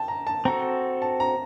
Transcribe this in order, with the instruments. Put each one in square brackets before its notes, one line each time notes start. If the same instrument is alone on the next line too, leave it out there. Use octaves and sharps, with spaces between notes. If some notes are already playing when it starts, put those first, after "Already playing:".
Already playing: [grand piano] G5 A5
A#5
A5
[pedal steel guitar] C4 F#4 A4 [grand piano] A#5
[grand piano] A5
A#5